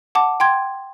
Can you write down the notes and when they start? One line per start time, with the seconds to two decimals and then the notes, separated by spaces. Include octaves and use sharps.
0.15 F#5 A5 D6
0.40 G5 C6 G#6